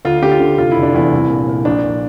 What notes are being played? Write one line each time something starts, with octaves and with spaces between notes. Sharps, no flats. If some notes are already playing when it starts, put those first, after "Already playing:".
D2 F4
D3 G4
F4
D3
F1 F4
F1 E4
D4
E2 E4
C2
A#2
A#2
A#1 D4
A#1